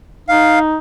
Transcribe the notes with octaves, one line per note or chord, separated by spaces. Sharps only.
D#4 F5